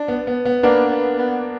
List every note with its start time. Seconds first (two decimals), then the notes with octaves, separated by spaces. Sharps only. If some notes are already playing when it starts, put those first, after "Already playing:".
Already playing: D4
0.08 B3
0.27 B3
0.45 B3
0.63 A#3 B3 D4
0.91 B3
1.18 B3